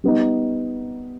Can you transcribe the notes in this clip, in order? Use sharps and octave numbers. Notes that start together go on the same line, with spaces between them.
G3 B3 D#4